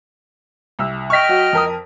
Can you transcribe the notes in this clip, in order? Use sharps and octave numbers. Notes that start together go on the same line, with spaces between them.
C2 E6
D#5 G5 C#6 F6 B6
F#3 F#4
F2 A#4 D#6